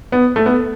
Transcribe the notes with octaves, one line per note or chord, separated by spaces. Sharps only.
B3
A3
B3